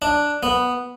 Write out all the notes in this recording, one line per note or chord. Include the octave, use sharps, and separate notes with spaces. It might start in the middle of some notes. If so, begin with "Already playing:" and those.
D4
B3